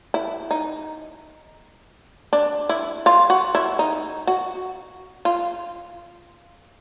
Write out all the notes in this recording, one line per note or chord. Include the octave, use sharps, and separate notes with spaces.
E4
D#4
D4
E4
F4
F#4
E4
D#4
F#4
F4